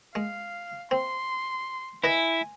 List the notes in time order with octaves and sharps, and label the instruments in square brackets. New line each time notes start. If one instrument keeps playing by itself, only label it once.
[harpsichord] G#3 [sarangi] F5
[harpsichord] C4 [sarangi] C6
[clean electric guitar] E4 [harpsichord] B4 D#5 E5 [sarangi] G#5